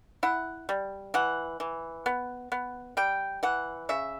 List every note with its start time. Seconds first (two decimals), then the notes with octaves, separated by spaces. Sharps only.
0.23 E4 F#5
0.69 G3
1.14 E3 F#5
1.60 E3
2.06 B3
2.52 B3
2.97 G3 G5
3.43 E3 F#5
3.89 C#3 E5